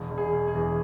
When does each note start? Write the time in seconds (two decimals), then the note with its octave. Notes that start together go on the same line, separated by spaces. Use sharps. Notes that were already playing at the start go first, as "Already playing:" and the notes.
Already playing: E1
0.11 E1
0.18 G#4
0.33 E1
0.48 G#4
0.55 E2